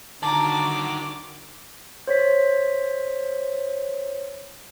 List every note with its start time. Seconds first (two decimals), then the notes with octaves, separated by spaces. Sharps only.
0.23 D3 D#3 F#4 D5 A5 A#5 D6
2.07 C5 C#5 B6